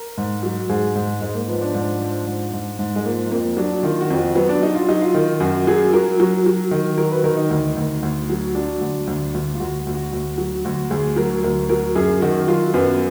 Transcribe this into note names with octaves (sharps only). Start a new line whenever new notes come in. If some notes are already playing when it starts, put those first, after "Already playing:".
Already playing: A#4
G#2
F#3
G#2 G#4
G#2
G#2 G#3
A#3
F3 B3
D4
G#2
F3
G#2
G#2
G#2
G#3
F3 A#3
F2 A#3
F#3 D4
D#3 F4
F#4
F2
F#4
F#3 B3
D4
F#3 D#4
F4
F#3 D#4
F4
D#3
F#2 F#4
F#3 G#4
F#3 A#4
F#3
F#3
D#3
F#3 A#4
B4
D#3 A#4
D#4
D2
D2
D2
F#3
F#3 D4
D2
D2
D2
F4
D2 F#4
D2
F#4
D2
F#3
D2 F#4
D2 G#4
F#3 A#4
D2 A#4
F#3 A#4
F#2 G#4
D#3 F#4
F#3 F4
F#2 B3